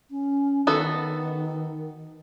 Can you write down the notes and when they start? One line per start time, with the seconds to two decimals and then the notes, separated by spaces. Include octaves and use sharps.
0.11 C#4
0.67 D#3 B3 F#4 A4